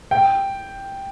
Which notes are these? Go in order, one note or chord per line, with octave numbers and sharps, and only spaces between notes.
G5